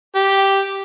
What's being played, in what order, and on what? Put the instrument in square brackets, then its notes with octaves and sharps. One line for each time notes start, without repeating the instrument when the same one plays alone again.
[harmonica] G4